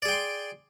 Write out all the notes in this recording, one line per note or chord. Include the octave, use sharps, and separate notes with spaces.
G#4 D5 G5 C6